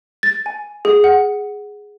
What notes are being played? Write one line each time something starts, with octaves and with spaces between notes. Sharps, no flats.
A6
G#5
G#4
F#5